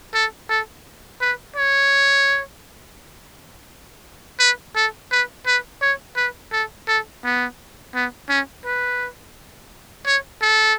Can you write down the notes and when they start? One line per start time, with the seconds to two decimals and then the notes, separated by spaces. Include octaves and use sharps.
0.14 A4
0.49 A4
1.21 B4
1.56 C#5
4.40 B4
4.76 A4
5.11 B4
5.46 B4
5.82 C#5
6.16 B4
6.52 A4
6.88 A4
7.24 B3
7.95 B3
8.29 C#4
8.65 B4
10.06 C#5
10.42 A4